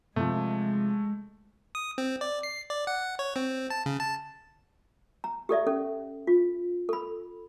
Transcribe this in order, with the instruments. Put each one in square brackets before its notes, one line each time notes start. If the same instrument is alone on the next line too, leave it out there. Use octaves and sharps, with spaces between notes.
[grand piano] C3 F3 [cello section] G#3 [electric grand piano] A3
[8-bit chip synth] D#6
C4
D5
C7
D5
F#5
C#5
C4
A5
C#3
A5
[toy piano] A#5
G4 A4 D5 E5
C#4 A4
F4
A4 B5